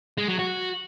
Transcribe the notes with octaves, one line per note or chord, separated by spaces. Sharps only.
G#3
F#3
F#4